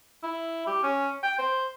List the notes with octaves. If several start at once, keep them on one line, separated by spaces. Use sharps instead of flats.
E4
G4
C#4
G5
C5